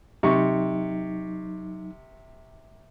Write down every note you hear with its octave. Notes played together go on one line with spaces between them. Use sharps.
C3 F#3 D#4 C#6